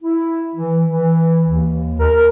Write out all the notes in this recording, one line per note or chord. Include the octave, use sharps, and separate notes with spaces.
E4
E3
E3
D#2
A#4